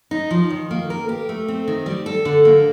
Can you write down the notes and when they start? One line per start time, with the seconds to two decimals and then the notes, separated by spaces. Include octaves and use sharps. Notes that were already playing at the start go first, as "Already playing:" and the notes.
0.11 D#4
0.31 F3
0.50 D#3
0.71 A#3
0.90 A#4
1.09 G4
1.29 A3
1.48 C4
1.68 D#3
1.86 G3
2.06 A4
2.25 D3
2.45 A#3